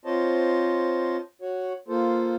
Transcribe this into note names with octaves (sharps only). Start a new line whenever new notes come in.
C4 F4 C5 C#5 D#5 A5
F#4 C#5
A#3 F4 A4 C5